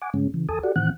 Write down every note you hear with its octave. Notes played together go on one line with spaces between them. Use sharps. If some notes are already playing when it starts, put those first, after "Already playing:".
F#5 G#5 D6
G2 C#3 G#3 C#4
C#3 E3
E2 A4 G#5 A5 D#6
F#4 G4 A4 D5 F#5
A2 D#3 E3 C4 F#5 F#6